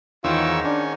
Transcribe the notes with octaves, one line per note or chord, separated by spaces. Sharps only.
E2 G#2 D#3 F4 C#5 E6
C#4 D4